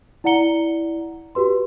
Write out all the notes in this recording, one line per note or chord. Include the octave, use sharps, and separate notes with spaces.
E4 D5 F#5 A#5 C#7 G7
F#4 G4 B4 C6